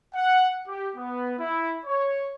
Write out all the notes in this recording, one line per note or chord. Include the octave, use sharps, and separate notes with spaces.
F#5
G4
B3
E4
C#5